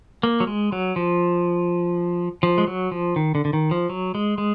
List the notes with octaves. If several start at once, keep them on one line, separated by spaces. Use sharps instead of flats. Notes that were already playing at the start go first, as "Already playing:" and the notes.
A#3
F#3
G#3
F#3
F3
F3
G#3
F#3
F3
D#3
D3
D3
D#3
F3
F#3
G#3
G#3